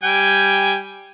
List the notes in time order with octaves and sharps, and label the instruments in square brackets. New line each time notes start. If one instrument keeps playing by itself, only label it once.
[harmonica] G3 G5 G#5